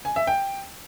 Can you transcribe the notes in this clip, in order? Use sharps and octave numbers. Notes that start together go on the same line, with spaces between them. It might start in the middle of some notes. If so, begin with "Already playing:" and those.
G#5
E5
G5